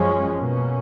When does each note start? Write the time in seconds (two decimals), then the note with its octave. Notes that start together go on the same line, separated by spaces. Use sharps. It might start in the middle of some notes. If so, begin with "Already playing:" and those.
Already playing: F#2 F3 G#3 C#4
0.40 B2 A#3 C#4